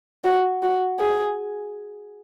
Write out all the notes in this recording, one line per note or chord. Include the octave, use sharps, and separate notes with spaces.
F#4
F#4
G#4